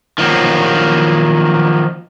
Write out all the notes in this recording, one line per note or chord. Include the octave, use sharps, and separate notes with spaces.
D#3 F3 F#3 A#3